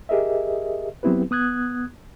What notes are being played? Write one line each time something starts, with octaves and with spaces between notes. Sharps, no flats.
G4 G#4 A#4 D#5 E5
F#3 B3 C4 E4 G4 B4
B3 D#6 F#6 G#6